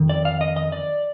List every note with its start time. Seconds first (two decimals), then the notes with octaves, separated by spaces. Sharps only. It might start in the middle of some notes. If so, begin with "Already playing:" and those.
Already playing: F2 D#3
0.09 D5
0.25 F5
0.41 D#5
0.56 D#5
0.72 D5